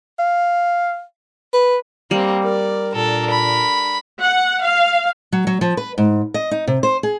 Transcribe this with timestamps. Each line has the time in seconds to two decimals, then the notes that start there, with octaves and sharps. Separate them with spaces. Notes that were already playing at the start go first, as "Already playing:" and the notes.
0.19 F5
1.53 B4
2.11 G3 A#3 C4
2.44 A#4 D5
2.95 A#2 D4 A4 A#4
3.30 B5
4.22 F#5
4.62 F5
5.32 F#3
5.47 F#3
5.61 F3
5.77 B4
5.98 G#2
6.34 D#5
6.51 D#4
6.67 C3
6.83 C5
7.03 G#4